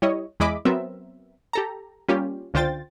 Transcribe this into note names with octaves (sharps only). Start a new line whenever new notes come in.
G3 E4 C#5 D#5
E2 G#3 E4 D#5 B5 D6
F#3 B3 C4 A#4 E5
G4 A4 A#5
G3 A#3 C#4 F4 G4
C#2 D3 F4 C5 G5 A6